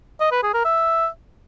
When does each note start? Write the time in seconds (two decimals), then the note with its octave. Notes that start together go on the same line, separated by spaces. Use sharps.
0.21 D#5
0.32 B4
0.43 G#4
0.54 A#4
0.65 E5